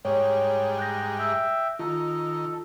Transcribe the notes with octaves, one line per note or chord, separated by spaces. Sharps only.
G#2 G3 C#5
F#6 G6 A#6
E5 G5
D#3 F4 A4